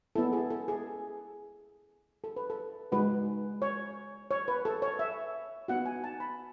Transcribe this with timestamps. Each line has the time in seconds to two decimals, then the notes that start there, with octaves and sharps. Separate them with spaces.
0.16 B3 E4 A4
0.33 G#4
0.50 A4
0.68 G#4
2.24 A4
2.36 B4
2.50 A4
2.92 G#3 D#4 F#4 B4
3.62 C#5
4.31 C#5
4.48 B4
4.65 A4
4.82 C#5
4.99 E5
5.68 B3 D#4 F#4 F#5
5.86 G#5
6.04 A5
6.20 B5